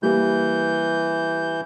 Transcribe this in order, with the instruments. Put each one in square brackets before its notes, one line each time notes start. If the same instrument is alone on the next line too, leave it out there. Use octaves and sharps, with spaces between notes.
[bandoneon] E3 G6 [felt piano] G3 A#3 G4